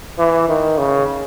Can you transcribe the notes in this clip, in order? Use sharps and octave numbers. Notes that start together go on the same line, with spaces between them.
E3
D#3
C#3